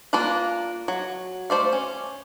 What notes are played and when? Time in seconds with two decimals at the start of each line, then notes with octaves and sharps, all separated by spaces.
0.13 A#3 D4 F4 B4 F5
0.88 F#3
1.50 A3 C5 D5 F5
1.73 C#4